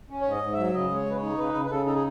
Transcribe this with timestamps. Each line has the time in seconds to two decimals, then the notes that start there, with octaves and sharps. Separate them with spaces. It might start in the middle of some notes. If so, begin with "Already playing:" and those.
0.10 C#4
0.21 G#2 C#5
0.31 D#5
0.42 G#2
0.53 E5
0.58 F#3
0.74 C#3 D#5
0.90 G#3 C#5
1.06 C#3 B4
1.17 C#5
1.22 D#4
1.38 C#3 B4
1.54 C#3
1.65 B4
1.70 C#3 A4
1.86 D#4 A4
1.95 G#4